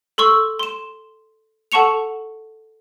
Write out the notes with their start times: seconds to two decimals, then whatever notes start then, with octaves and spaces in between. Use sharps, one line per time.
0.18 A4 C6 C#6 E6
0.59 C6 E7
1.72 A4 F#5 A5 C#6 C#7 F7